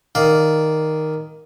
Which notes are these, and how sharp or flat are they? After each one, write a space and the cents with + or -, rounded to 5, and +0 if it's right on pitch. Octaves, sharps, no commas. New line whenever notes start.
D#3 +0 D5 -10 F5 +0